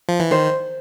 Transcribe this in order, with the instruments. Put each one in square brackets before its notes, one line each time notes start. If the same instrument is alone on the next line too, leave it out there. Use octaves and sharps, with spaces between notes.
[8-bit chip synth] F3
E3
[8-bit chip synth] D#3 [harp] C5